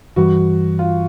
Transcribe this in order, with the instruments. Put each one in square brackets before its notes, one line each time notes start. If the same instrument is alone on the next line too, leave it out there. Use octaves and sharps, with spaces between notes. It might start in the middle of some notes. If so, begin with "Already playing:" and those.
[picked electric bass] G2 E3 G3 [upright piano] F#4
[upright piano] F4